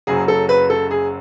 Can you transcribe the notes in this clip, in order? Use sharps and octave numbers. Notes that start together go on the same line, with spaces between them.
F#1 F#2 C#3 F#3 G#4
A4
B4
A4
G#4